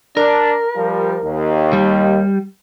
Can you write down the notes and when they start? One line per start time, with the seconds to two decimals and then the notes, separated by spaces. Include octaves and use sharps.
0.17 D4 A#4
0.76 F3 G3
1.23 D#2
1.73 G3